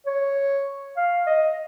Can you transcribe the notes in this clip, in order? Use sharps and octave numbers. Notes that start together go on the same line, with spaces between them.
C#5
F5
D#5